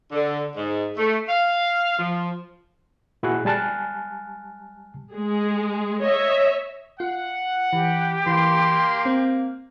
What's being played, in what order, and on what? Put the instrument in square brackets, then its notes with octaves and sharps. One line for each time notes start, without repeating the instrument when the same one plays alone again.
[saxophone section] D3
G#2
A3
F5
F3
[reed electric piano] A#2 E4 F#4 G#4 F#6
G3 G#5 A5 F6 F#6
[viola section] G#3 G#4
C#5 D#5 E5
[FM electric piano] F4 [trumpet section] F#5
[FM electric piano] E3 [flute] G4
[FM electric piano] E3 [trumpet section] A#3 F5 [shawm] C6
[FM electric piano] C4